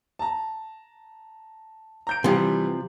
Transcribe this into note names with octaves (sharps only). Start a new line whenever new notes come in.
A5 A#5
A#5 G6 D7
C3 E3 F3 G3 G4